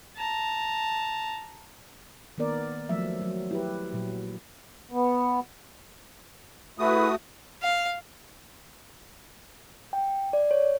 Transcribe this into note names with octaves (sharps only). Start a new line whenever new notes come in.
A5 A#5
D#3 A#3 B3 A#4 D5
F3 F#3 A3 E5
F#3
E4 G4 B4
A#2 F#3
B3
A3 E4 F#4 G#4 B4 D#6
F5
G5
D5
C#5